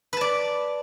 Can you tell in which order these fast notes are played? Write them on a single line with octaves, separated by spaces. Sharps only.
B4 A5 D5